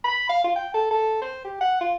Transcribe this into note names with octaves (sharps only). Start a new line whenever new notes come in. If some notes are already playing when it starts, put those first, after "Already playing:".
B5
F5
F4
G5
A4
A4
C5
G4
F#5
F4